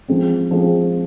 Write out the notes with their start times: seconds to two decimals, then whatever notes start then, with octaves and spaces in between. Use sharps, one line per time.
0.08 F3 G#3 C4
0.51 F3 G#3 C4